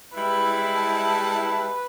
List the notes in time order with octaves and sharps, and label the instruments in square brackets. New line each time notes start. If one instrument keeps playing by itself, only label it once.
[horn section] G3 G#3 E4 [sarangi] B4
[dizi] A5